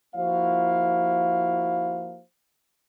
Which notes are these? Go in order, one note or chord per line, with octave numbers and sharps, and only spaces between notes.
F3 A#3 E4 F#4 C5 F5